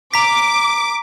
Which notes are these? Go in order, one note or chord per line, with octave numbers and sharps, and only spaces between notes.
A#5 D6 B6